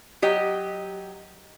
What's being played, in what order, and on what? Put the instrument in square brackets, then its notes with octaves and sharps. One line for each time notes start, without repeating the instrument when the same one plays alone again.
[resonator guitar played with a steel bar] F#3 G4 D#5